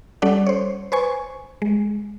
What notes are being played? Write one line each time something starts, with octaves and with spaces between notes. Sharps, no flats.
G3 C#4 A4 D5 F#5
C5 C#5
B4 C5 G#5 C#6
G#3